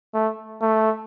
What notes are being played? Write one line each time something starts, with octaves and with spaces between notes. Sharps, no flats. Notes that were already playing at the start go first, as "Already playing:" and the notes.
A3
A3